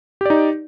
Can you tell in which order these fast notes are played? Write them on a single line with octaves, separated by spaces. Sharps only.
G4 D5 D#4